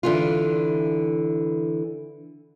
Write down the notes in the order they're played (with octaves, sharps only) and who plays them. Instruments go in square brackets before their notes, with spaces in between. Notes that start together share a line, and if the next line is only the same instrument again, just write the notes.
[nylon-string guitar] D3 E3 F4